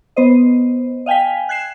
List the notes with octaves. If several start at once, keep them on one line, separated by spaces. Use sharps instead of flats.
B3 C5 D#5
D#5 F5 G5 G#5 B6
F#6 G#6 C7 E7